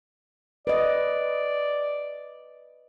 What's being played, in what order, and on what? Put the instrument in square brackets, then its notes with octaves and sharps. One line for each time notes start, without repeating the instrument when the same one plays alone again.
[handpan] B4 D#5 [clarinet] D5